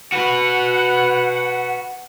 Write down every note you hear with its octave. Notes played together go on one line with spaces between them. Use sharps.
F#4 B4 F#5